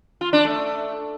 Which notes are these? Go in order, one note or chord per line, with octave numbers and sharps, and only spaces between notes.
F4
D4
A3